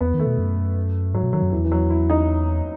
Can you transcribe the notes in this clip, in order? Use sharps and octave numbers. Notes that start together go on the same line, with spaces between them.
E2 B3
D#3
A3
B2
F#2
G#2 F#3
B2
D#3 F#3
F#2
E2 E3
E3
F#3
E4
D#4